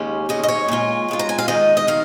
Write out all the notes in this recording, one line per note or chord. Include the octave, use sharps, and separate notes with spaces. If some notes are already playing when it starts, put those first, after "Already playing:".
Already playing: D#2 C#3 G#3 C#4
D#2 C#3 G#3 C#4 D#5
D#5
C#5
A#2 G#3 F4
A#2 G#3 F4
A#5
G#5
F5
D#3 G#3 D#4 D#5
D#5
D#3 G#3 F5